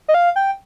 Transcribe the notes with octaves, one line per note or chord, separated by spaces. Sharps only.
D#5
F5
G5